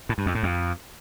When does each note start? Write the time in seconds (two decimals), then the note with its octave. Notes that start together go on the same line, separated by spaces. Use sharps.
0.09 A2
0.18 G2
0.26 F2
0.35 A2
0.43 F2